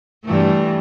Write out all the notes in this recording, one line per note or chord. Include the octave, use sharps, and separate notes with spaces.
G2 E3 A3